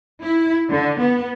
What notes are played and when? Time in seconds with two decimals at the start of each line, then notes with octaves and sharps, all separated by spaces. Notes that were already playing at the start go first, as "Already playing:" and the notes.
0.22 E4
0.69 D3
0.98 B3